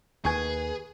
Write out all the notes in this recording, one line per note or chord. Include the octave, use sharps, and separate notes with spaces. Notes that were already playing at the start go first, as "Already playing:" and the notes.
D#2 D#3 G#4 B4 G#5 C#6